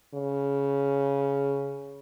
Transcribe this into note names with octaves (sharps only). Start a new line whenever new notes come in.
C#3